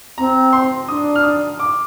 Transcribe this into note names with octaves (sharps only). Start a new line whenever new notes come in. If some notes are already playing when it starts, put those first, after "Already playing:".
C4 A#5
C6
D4 D#6
F6
D#6
D6